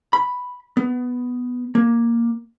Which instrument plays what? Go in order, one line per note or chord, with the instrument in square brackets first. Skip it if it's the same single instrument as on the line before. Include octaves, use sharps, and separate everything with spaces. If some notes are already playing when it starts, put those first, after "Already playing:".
[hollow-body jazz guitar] B5
B3
A#3